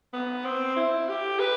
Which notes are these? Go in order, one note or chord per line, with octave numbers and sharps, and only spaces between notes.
B3
C4
E4
G4
B4